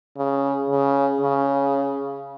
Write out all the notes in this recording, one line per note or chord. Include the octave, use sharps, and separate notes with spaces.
C#3
C#3
C#3